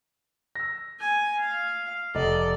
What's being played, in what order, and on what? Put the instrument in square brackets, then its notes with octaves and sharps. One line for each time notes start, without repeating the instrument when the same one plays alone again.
[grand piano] E6 A#6
[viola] G#5
F5
[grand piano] F1 D#5 [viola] A4 D5